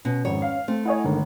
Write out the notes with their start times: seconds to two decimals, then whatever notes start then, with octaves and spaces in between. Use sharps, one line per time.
0.05 B2 C#4
0.25 G#1 F2 G#2 C#5
0.42 F5
0.68 A3 C4
0.85 E4 C#5 D#5 F#5 G#5
1.05 G1 D3 D#3 G#3